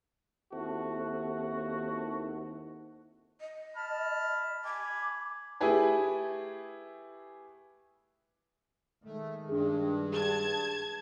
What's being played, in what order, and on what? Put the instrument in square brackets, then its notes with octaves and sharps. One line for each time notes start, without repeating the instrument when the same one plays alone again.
[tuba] D#2 [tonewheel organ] C4 E4 A4 [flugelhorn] F#4
[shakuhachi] D#5
[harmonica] A5 B5 F6
[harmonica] G#5 B5 [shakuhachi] D6
[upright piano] A3 E4 G4 G#4 B4 G#5
[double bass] D#3 G#3 [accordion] A3
[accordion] G2 [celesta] D4 G#4
[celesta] G#4 [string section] A5 G#6